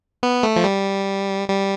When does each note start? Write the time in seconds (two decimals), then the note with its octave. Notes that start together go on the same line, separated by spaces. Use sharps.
0.23 B3
0.43 A3
0.56 F3
0.64 G3
1.48 G3